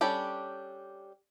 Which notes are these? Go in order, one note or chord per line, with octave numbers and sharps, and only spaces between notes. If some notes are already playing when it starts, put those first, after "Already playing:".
G3 C#4 D4 G4 A4